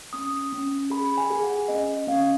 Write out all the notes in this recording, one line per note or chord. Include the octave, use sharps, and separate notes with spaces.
C#4 D#6
C#4
G#4 B5
G#5
G#4
F#5
C#4 D#5
C#4 F5